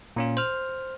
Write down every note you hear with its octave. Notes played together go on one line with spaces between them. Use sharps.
A#2 C#4 F4
C5 F6